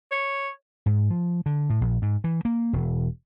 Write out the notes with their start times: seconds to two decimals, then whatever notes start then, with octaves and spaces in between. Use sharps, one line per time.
0.12 C#5
0.86 G#2
1.10 F3
1.46 D3
1.70 A2
1.81 A#1
2.02 G#2
2.24 E3
2.45 A#3
2.73 E1